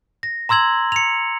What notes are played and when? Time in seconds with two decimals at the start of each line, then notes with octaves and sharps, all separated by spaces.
0.23 A#6
0.49 A#5 C6 E6 G#6 F#7
0.92 C#7 F7